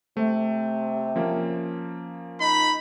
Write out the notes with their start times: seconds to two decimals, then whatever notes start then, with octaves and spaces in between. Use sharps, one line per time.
0.17 C3 A3
1.16 F3 A#3 C#4
2.40 D#4 B5